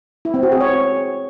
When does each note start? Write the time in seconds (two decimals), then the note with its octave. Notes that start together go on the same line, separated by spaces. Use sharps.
0.25 E4
0.34 C4
0.43 F#4
0.52 G#4
0.61 C#5